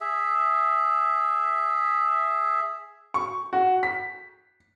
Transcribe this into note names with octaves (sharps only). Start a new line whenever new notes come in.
G#4 E5
C#6
F#4
B6